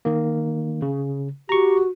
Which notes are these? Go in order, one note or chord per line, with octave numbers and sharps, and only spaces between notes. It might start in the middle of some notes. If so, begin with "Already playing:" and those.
D#3 A#3
C#3
F#4 G4 A#5 C#6